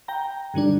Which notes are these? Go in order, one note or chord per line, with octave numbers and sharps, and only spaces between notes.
G5 A#5
G2 D3 G3 D4